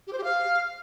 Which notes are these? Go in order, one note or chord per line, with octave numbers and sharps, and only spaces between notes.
G4
C5
G4
F5